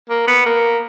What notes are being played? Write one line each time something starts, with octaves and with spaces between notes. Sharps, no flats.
A#3
B3
A#3